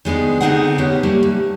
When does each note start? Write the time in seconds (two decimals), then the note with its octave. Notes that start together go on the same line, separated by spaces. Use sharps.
0.05 D#3 G#3 B3 D4
0.41 D3 B3 C4 D#4 G#4 F#5
0.78 G2 C3 G#3 B3 C#4
1.03 G3 A3 A#3
1.23 G2